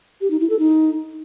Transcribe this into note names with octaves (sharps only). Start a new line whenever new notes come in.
G4
D#4
E4
A4
D#4